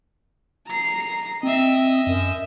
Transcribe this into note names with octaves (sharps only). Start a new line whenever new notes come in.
A#5 C7
C4 D#5 E5
F#2